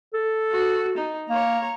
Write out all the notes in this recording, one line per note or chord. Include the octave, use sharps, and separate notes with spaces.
A4
F#4
D#4
A#3 C#5 A#5